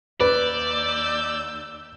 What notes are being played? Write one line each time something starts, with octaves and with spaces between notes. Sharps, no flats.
D#2 B4 D5 E6 G6